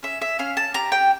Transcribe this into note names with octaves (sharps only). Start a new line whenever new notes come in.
C#4 E5
E5
C#4 F5
A5
G4 A#5
G5